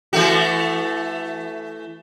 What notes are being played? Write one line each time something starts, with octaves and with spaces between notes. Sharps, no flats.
E3 A3 F#4